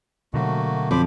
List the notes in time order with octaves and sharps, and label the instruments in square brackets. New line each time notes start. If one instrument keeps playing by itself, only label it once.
[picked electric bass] B2 D3 F#3 [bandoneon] A3 A#3 F#4
[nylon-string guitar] F2 [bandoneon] C5 B5 D6